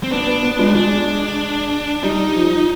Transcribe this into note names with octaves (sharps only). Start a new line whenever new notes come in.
C4
B3 D4
B3
B3
G#3
G#3 D4
G3 D#4
F3